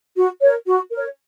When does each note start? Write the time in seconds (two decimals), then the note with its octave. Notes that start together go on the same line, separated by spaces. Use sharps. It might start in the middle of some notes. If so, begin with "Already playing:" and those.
0.16 F#4
0.41 A#4 C#5
0.66 F#4
0.92 A#4 C#5